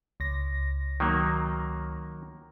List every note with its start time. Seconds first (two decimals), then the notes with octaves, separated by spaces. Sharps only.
0.20 C#2 A#6
1.00 D#3 F#3 A#3